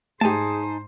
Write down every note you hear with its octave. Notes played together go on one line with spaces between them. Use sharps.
G#2 A3 D#4 G4 G#4 C5 G#5 A5